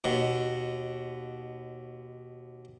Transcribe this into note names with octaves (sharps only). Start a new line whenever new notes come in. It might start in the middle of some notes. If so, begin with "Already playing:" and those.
D#2 B2